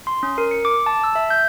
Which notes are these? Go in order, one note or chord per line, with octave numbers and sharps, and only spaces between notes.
C6
C#4
A#4
C#7
D6
A5
E6
E5
G6